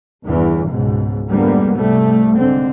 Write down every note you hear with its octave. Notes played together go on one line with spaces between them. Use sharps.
G1 E2 E3
C#2 G#2 B2
F2 G#2 D3 G3 A#3 B3
C2 C3 G3 A3
G#2 D3 C4